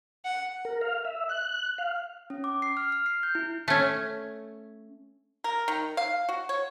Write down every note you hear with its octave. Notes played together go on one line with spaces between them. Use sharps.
F#5
A#4
F5
E5
F#6
F5
C#4
D6
C7
F6
F6
C7
G6
E4
A3 C#4
A#4
D#3
F5
F#4
C#5